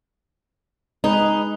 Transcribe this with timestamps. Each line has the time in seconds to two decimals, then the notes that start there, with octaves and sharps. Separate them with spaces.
1.04 G#3 D#4 G#4 B4